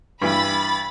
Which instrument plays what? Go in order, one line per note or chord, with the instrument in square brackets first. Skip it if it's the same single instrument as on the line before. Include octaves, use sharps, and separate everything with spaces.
[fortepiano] G2 E3 [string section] B5 A6